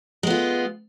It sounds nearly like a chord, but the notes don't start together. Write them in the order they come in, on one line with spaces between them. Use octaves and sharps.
G#3 B3 F4